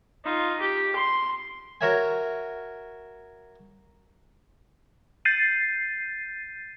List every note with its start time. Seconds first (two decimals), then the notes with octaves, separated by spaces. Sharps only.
0.25 D#4 F4
0.60 G4
0.96 C6
1.81 F#4 A#4 C#5 E5 G#5
5.25 G6 A6 C7 D#7